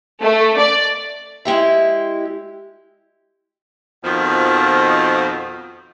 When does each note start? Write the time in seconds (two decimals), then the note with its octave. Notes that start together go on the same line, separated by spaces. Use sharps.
0.22 A3
0.57 D5
1.45 G#3 E4 G4 E5
4.04 F2 B2 D#3 F3